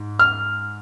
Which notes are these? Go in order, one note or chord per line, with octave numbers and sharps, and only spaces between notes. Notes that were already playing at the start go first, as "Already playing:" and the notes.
Already playing: G#2
F6